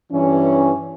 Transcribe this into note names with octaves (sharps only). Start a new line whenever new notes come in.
G2 E3 C#4